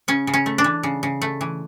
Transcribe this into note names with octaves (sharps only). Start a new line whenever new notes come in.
C#3 C#4
C#3
C#4
A3
D4
E3
C#3
C#3
A3
E3